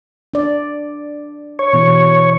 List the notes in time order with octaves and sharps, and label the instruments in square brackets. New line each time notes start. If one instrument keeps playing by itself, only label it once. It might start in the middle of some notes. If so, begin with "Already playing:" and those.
[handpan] D4 D5
[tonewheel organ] C#5
[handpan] B2 E3